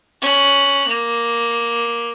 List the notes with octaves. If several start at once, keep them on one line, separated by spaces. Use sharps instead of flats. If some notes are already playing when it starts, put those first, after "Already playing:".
C#4 F#6
A#3